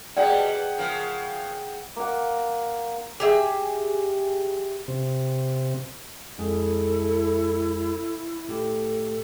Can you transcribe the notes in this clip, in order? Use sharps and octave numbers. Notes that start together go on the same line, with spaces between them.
B2 G3 G#4 D5 F#5 G5
C#3 F3 A#4
A#3 F#5
G4 G#4 E5
C3
F2 G#3 E4 G#4 A4
A2 A3 G4 A4